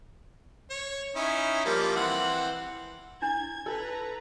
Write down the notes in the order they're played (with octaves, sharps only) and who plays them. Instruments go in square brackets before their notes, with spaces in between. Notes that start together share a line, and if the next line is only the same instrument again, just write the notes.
[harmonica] C#5
C#4 D#4 E4
F3 G3 A#3
E3 C4 F#5
[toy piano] D4 E4 [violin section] G#6
[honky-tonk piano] A4 [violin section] B4 A#5